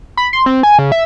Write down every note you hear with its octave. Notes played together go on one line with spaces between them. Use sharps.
B5
C6
C4
G#5
C#3
E5